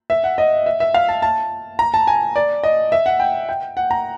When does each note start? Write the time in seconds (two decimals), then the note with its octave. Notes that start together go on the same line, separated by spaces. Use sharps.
0.10 E5
0.24 F#5
0.38 D#5
0.66 E5
0.80 E5
0.94 F5
1.09 A5
1.22 A5
1.79 A#5
1.94 A5
2.07 G#5
2.36 D5
2.64 D#5
2.92 E5
3.06 F#5
3.20 G5
3.49 G5
3.77 F#5
3.91 A#5